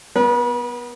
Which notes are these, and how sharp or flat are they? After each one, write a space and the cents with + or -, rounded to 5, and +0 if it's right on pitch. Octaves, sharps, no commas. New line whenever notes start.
B3 +0 B4 -40